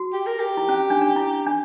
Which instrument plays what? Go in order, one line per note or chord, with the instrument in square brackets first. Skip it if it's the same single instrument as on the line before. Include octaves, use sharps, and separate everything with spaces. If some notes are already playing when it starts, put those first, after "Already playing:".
Already playing: [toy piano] F#4
[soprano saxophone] G4
A#4
G4
[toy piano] E4
C#4
D4
D4
E4
D4